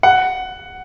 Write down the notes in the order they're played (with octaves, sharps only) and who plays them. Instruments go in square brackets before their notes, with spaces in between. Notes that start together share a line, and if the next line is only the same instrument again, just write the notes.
[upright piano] F#5